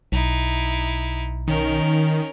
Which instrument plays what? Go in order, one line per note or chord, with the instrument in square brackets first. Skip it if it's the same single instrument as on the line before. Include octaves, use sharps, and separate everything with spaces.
[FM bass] B1 [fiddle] D#4 E4
[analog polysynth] D#3 [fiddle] C#4 A#4